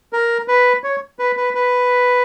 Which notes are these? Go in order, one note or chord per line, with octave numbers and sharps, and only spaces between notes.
A#4
B4
C#5
B4
B4
B4